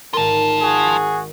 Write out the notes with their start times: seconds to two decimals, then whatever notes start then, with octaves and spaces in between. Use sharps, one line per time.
0.13 G#1 F4 A#4 A5
0.62 F#4 G#4